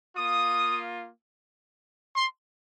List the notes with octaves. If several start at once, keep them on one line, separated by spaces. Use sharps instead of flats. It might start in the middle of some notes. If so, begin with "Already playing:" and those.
A#3 F4 D#6
C6